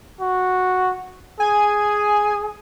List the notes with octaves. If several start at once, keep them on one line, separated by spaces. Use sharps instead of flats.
F#4
G#4 G#5